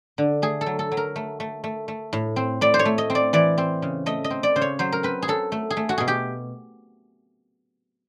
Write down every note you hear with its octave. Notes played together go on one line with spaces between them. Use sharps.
D3
A3 G#4
A4
F#3
A4
F#3
A#4
A3
A3
A3
A3
A2
C4
A2 D5
C5
C#5
A3
D#5
C4
D5
E3 D5
C4
C#3
A3 D#5
D#5
C4
D5
C#3 C5
C#5
F#3 C5
A#4
C4 B4
G#4
F#3 A4
A3
G#4
A3
F#4
B2 G#4
G4